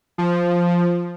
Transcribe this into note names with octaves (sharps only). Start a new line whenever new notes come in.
F3